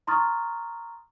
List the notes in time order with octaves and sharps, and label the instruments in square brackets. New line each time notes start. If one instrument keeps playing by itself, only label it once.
[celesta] A#5 C6 C#6 D#6 F6 A6